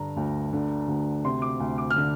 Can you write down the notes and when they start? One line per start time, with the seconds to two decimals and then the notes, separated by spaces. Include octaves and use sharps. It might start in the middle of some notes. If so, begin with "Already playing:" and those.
Already playing: G2 D3 A#5
0.16 D2
0.53 D3
0.88 D2
1.24 C3 C6
1.42 D6
1.60 D2
1.78 D6
1.90 F6
1.96 D3